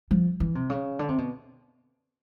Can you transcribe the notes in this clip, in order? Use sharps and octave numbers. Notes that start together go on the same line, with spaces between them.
F3
E3
C3
C#3
D3
C3
B2